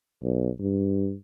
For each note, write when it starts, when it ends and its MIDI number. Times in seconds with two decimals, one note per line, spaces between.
0.22 0.49 35
0.60 1.14 43